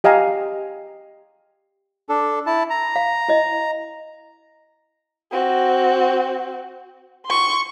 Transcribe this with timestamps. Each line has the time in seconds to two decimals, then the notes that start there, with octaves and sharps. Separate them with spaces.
0.04 G4 D#5 F5 G#5 A#5
2.09 D4 A4
2.47 E4 A5
2.70 A#5
2.96 F5
3.28 E4 D#5
5.32 C4 F#4
7.26 C6 C#6